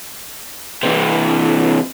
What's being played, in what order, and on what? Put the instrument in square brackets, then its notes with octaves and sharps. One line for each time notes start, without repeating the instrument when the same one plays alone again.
[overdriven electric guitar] C3 E3